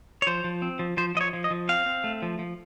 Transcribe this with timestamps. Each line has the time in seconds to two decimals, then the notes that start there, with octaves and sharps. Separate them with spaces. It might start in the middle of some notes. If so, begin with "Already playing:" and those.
0.22 C#5
0.27 F3 C5
0.44 F3
0.62 C4
0.79 F3
0.97 F3 C5
1.15 F3 D#5
1.21 C#5
1.33 F3
1.44 D#5
1.51 F3
1.69 C4 F5
1.86 C4
2.04 A3
2.22 F3
2.39 F3